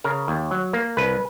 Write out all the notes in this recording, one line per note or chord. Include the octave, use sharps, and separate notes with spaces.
C#3 A#4
D#2
F#3
A#3
C2 B4